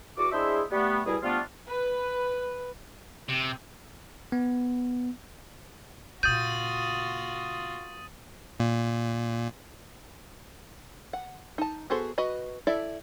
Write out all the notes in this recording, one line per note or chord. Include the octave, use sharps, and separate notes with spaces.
E2 F#4 D6
G#3 D4 E4 G#4 C5 E5
G3 A3 B3
C2 B2 G3 E4 G#4
F3 G3 A3 B3 D4 F4
B4
C3
B3
A#2 C#3 F4 F#4 D#6 G6 A6 D#7
A#2
F#5
D#4 A5
B3 F#4 G#4 A4 C5
F#4 B4 D#5 B5
E4 A4 D5 E5